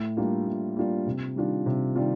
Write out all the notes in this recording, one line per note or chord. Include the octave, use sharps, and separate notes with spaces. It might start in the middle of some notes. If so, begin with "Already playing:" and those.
Already playing: A2
G3 A#3 D4 F4
A2
G3 A#3 D4 F4
C3
D#3 G3 D4 F4
C3
D#3 G3 D4 F4